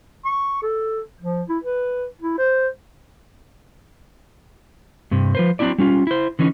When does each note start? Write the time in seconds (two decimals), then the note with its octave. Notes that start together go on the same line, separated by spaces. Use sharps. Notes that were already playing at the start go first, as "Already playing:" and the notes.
0.25 C#6
0.62 A4
1.20 F3
1.49 E4
1.64 B4
2.21 E4
2.38 C5
5.11 G2 C3
5.35 F3 B4 C5
5.59 F#3 C4 D4 E4 D5
5.78 G3 C#4 F4
6.07 E4 C5
6.39 D3 E3 C#4 D#4